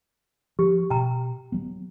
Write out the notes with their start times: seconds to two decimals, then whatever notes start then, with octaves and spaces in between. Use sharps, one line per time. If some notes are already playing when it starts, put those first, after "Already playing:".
0.59 F3 G4
0.90 B2 G5 A#5
1.52 F#3 B3